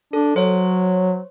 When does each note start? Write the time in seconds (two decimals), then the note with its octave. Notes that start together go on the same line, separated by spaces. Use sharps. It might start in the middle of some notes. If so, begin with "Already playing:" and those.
0.13 D4 A4
0.36 F#3 C5 C#5